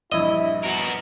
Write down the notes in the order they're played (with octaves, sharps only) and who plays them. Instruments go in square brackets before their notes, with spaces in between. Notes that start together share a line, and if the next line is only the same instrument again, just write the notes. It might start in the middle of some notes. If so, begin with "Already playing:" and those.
[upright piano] A#1 G2 [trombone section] E4 [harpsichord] D#5
[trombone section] B2 [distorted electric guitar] F#4 A#4